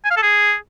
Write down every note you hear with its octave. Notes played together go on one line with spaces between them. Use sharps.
G#5
F5
A4
G#4